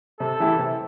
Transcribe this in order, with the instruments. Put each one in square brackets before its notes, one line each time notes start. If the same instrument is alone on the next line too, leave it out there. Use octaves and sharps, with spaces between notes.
[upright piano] C3 [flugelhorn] A4
[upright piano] E3 A3 E4 G4
C3